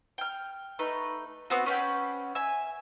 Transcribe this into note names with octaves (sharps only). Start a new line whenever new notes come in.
G5 F6
A3 D#4 B4
B3 C4 F#4
C#4 B4 F#5 G5
E5 G#5